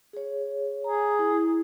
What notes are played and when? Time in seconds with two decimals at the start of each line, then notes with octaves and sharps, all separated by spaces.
0.13 G#4 C#5
0.84 G#4 A#5
1.19 E4